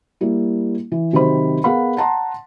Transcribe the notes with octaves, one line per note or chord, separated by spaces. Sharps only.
G3 A#3 E4
E3
C3 D#3 F#3 F#4 C5 B5
B3 G#4 A#4 F5 F#5 B5
F#5 A5 A#5 C6